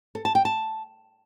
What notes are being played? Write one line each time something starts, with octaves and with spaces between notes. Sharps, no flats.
A4
A5
G5
A5